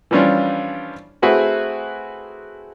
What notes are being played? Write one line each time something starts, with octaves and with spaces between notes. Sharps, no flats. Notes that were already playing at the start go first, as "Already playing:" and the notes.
E3 F3 G3 C#4 D4 F4
A3 C4 E4 F#4 G#4 B4